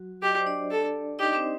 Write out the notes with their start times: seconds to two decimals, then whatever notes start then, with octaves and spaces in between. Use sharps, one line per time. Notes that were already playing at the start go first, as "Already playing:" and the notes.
Already playing: F#3 F#4
0.22 G4 D#5
0.30 D5
0.38 C5
0.46 D4 D5
0.71 A4
1.19 D#4 G4 D#5
1.35 C4 C5